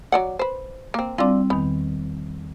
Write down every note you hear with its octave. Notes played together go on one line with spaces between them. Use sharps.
F#3 D5 F#5
B4 C5
A#3 C4
G3 C4 D4 E4 F4
E2 D#3 B3